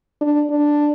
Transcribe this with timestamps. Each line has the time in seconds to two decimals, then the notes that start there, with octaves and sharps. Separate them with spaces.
0.21 D4
0.50 D4